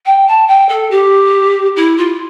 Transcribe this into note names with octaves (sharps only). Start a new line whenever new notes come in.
G5
A5
G5
A4
G4
E4
F4